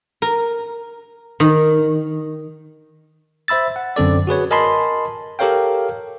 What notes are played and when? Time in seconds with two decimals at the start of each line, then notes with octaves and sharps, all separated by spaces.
0.22 A#4
1.40 D#3
3.48 C5 E5 B5 E6 A6
3.76 F#5
3.96 F#2 D3 C4 A4 D5
4.27 F#4 G#4 B4 C#5
4.51 A#4 D#5 G#5 A5 B5 C6
5.39 G4 A4 A#4 C#5 F5 G5